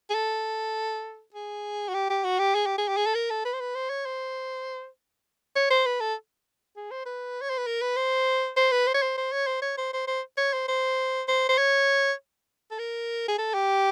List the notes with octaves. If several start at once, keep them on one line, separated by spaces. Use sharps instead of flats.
G#4
A4
G#4
F#4
G4
G4
F#4
G4
G#4
G4
G#4
G4
G#4
A4
A#4
A4
B4
C5
B4
C5
C#5
C5
C#5
C5
B4
A4
G#4
C5
B4
C#5
C5
B4
A#4
B4
C5
C5
B4
C5
C#5
C5
C5
C#5
C5
C#5
C5
C5
C5
C#5
C5
C5
C5
C5
C#5
A4
A#4
G#4
A4
G4